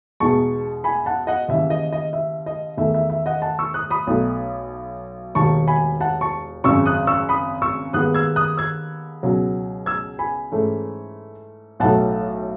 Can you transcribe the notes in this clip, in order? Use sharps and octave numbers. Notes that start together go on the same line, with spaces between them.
E2 B2 G#3 D#4 A5 C#6
G#5 B5
F#5 A5
D#5 F#5
D#2 C#3 E3 E5
D#5
D#5
E5
D#5
E2 D#3 A3 E5
E5
E5
D#5 F#5
F#5 A5
C#6 E6
D#6 F#6
B5 D#6
B1 B2 A3 D#4
E1 D#2 D#3 A5 C#6
G#5 B5
F#5 A5
A5 C#6
G#1 F#2 C#3 C#6 E6
D#6 F#6
C#6 E6
B5 D#6
C#6 E6
D#2 D#3 G#3 B3 D#6 F#6
E6 G#6
D#6 F#6
E6 G#6
C#2 B2 F#3
E6 G#6
G#5 B5
G#2 E3 A3 C#4
B1 A2 F#3 A3 D#4 F#5 A5